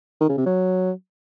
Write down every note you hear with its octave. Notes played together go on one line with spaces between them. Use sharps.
D#3
C#3
C3
F#3